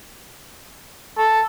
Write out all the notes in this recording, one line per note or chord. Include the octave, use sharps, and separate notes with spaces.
A4